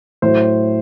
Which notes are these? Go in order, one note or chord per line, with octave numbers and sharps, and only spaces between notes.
A2 F#3 C5